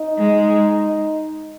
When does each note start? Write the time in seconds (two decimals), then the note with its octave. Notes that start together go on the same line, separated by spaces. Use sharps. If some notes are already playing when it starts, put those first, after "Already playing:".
Already playing: D#4
0.19 G#3